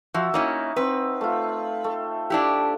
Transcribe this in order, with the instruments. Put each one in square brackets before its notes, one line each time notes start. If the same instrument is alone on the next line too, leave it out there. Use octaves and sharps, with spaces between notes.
[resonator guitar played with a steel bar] F3 [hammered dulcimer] F#4 E5
[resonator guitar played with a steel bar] A#3 C#4 E4 [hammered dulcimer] D#4
[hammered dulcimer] C4 [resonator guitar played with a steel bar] B4
[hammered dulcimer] A3 F4
A3
[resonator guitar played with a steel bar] D4 E4 G4